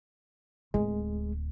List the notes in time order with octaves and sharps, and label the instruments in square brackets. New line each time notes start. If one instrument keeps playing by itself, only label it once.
[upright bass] D1 [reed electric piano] G#3